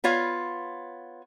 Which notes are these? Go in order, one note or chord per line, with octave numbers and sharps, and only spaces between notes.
B3 F4 C#5 F5